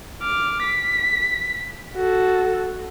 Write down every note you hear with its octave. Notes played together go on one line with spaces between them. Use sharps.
D6 F6
B6
F#4 A4